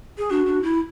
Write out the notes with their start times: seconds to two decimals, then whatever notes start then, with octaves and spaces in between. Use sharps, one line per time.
0.18 G#4
0.30 D4 F#4
0.46 D4
0.62 E4